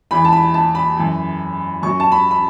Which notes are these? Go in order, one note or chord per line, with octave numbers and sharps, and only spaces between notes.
E2 E3 B5
A5
B5
A5
B5
F#2 E3
F#2 F#3 C#6
A5
B5
B5